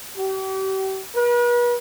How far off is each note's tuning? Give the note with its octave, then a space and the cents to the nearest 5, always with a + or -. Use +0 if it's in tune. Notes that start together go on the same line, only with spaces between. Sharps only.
G4 -40
B4 -40